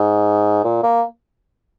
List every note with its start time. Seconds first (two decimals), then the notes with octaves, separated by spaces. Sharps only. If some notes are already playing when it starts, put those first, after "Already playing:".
Already playing: G#2
0.64 A#2
0.83 A#3